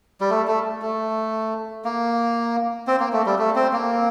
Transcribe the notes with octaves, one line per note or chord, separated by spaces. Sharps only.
G3
A3
A3
A3
A#3
C4
A#3
A3
G3
A3
C4
A#3